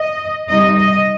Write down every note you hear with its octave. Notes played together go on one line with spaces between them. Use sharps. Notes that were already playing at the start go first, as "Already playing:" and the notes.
Already playing: D#5
C3 G3 D#4 D#5
D#5